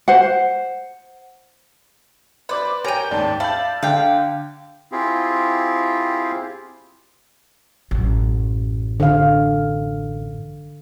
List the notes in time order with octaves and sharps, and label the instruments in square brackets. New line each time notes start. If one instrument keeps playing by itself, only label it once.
[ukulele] C5 F#5
[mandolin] B4 [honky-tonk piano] C5 D5 D6
[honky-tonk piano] G4 D#7 [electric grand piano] A#4 C#5 G#5 [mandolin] G5 A#5
[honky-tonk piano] D#2 G#2 [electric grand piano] D5 A5
[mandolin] D5 [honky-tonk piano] E5 A5 B5 [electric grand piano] F5 G6
[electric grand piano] D3 [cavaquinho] F5 G5
[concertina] C4 E4 F4 G4 G#4
[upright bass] A1 F#2
[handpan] D3 F5